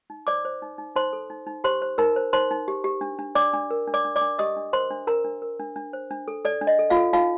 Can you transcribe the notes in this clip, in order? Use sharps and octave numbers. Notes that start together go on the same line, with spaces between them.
D#4
C5 D5 D6
C5
D#4
D#4
D#4 C5 C6
A4
D#4
D#4
G4 C5 C6
C5
D#4 A#4 A#5
C5
D#4 C5 C6
D#4
G4
G4
D4
D4
D4 D5 D6
D4
A#4
D4
D5 D6
D4
D5 D6
D4
G4 D#5 D#6
D4
A#4 C5 C6
D4
D4 A#4 A#5
D4
A#4
D4
D4
C5
D4
A4
A4 D5
D4
D#5
A4
F4 F5
A4
D#4 F4 F5